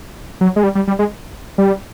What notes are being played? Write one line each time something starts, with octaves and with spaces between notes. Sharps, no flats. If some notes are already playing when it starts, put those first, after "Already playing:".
F#3
G#3
G3
G3
G3
G#3
G3